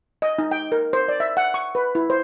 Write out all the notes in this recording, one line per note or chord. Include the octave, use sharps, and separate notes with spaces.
D#5
D#4
G5
A#4
C5
D5
E5
F#5
C#6
B4
E4
C5